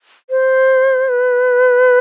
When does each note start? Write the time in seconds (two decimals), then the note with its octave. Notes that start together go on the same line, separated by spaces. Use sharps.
0.30 C5
1.09 B4